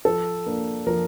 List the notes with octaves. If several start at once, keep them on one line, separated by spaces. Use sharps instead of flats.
F3 A4
A#3 D4
F3 A#4